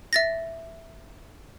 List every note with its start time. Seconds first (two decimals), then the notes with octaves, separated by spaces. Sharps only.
0.13 E5 A6 A#6